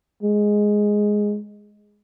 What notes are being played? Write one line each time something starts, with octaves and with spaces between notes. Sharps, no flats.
G#3